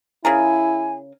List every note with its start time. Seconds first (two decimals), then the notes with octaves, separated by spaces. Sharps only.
0.25 C#3 E4 G#4 A#4 G#5